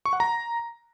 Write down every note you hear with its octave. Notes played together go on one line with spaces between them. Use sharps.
C#6
F#5
A#5